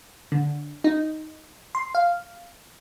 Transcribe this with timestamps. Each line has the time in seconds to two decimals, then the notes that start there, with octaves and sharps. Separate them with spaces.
0.32 D3
0.84 D#4
1.75 C6
1.95 F5